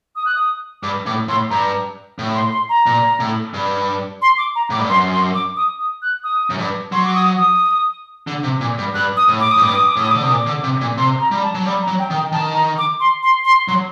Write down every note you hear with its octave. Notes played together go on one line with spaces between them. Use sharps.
D#6
F#6
D#6
G2 D6
A2 D6
A2 C6
G2 A#5
A2
C6
C6
A#5
A#2
A2
G2
C6
D6
A#5
A2 D6
G2
F#2 C6
C6
D6
D#6
D#6
F#6
D#6
F#2
G2
F#3 C6
D6
D#6
D#6
D3
C3
A#2
G2
G2 F#6
D#6
A2
D6
D#6
A2
G2 D6
D#6
D6
A2 D#6
D3 D6
C3 D#6
A#2
D6
D3
C3
A#2
C3 C6
A#5
G3
A5
F#3
G3
A#5
F#3
G5
D#3
G5
D#3 A5
A#5
D6
C6
C6
C6
F#3 C6